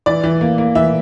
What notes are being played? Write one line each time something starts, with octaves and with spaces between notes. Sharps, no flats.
E3 D5
E3
A#3
A#3
E3 E5